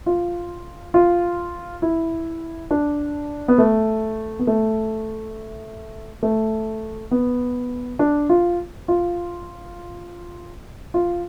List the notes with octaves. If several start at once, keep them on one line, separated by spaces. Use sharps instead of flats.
F4
F4
E4
D4
B3
A3
B3
A3
A3
B3
D4
F4
F4
F4